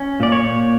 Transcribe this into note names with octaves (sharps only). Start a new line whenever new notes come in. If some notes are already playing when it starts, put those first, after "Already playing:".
Already playing: C#4
A#2 D5
C#5
A#2